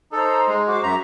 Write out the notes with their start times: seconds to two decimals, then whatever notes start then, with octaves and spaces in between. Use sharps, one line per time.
0.12 D#4 A4 C5 A#5
0.48 G#3
0.68 F#4 C5 D6
0.83 F#2 E5 A#5